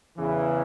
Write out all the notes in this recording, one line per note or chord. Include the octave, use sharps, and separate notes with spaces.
E2 C#3 E3